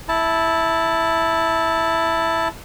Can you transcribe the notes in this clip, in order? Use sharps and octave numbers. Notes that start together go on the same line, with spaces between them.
E4 A5